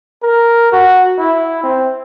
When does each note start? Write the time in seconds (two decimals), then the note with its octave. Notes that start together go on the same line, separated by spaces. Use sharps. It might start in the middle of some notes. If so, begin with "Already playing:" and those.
0.23 A#4
0.72 F#4
1.19 E4
1.63 C4